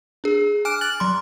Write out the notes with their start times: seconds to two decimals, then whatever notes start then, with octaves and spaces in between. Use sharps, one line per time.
0.24 D4 G#4
0.65 G#5 D6 F6 F#6 D7
0.81 F6 F#6 A6 F#7
1.00 F#3 C6